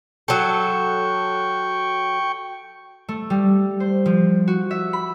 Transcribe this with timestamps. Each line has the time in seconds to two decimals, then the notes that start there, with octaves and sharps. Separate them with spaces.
0.28 F#3 A4 G5 C#6
3.09 A3
3.30 G3
3.80 C5
4.06 F3
4.48 F#4
4.71 E5
4.93 B5